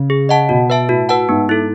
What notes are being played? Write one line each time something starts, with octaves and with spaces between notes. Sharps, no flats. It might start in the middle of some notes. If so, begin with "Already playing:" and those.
Already playing: C#3
G#4
D#5 F#5 A5
B2 F#4
B4 E5 A5
A2 F#4
B4 F#5 A5
G#2 B3
E4 A4